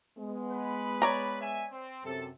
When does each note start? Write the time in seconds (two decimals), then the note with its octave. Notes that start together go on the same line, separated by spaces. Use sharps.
0.18 G#3 B3
0.51 B4 B5
1.02 C#5 D5 A#5
1.41 E5 G#5
1.70 C4
2.04 F#2 C3 A4